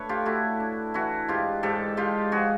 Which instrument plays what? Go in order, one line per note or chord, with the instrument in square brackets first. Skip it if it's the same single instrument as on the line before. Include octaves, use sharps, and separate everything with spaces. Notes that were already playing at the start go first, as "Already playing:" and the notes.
Already playing: [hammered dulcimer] A3 D4 B4 C#5
F4 G4
A3 E4 F#4
D4
E3 E4 F#4
G#2 F4 G4
G#2 G4 A4
G#2 F4 G4
F3 F#4 G#4